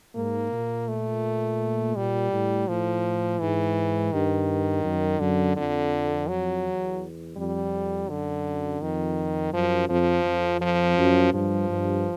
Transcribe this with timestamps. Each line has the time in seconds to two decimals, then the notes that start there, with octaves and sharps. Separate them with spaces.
0.15 G#2 A#3
0.52 A#2
0.88 A3
1.96 A#2 G3
2.32 A2
2.68 A2 F3
3.40 G#2 E3
4.13 G2 D#3
4.84 F#2
5.20 F#2 D3
5.56 F2 D3
6.29 F#3
6.64 E2
7.37 F2 G3
8.09 F#2 D3
8.81 F2 D#3
9.53 F#2 F3
9.89 F2 F3
10.25 F2
10.61 F3
10.97 F#2
11.33 G2 F3
11.69 G2